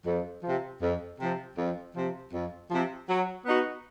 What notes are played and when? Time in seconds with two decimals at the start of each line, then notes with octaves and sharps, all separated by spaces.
0.06 F2
0.44 C3 F3
0.81 F2
1.20 C3 F3
1.58 F2
1.96 C3 F3
2.33 F2
2.71 C3 F3
3.09 F#3
3.46 B3 D#4 F#4